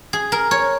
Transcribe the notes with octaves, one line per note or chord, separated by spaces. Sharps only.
G#4
A#4
C#5